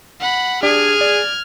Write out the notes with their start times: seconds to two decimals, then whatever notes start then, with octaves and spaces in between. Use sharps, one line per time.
0.20 F#5 B5
0.63 D4 G4 G#4 D5 F6 G#6
1.01 D5